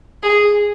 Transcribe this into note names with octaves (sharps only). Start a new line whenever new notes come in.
G#4